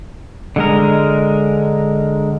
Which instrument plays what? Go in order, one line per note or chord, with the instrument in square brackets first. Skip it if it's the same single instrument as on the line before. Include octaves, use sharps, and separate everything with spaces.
[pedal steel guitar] D3 G#3 A#4